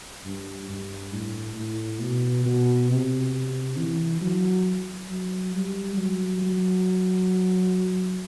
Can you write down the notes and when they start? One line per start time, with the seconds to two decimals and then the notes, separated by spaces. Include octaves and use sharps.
0.25 G2
0.69 G2
1.13 A2
1.56 A2
2.00 B2
2.45 B2
2.89 C3
3.77 E3
4.21 F#3
5.09 F#3
5.53 G3
5.97 F#3
6.41 F#3